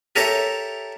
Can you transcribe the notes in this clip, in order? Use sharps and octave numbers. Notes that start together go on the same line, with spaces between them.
G4 A4 A#4 C#5 E5